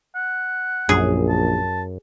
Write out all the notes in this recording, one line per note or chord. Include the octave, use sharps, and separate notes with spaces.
F#5
A#1 F#2 G#4
A5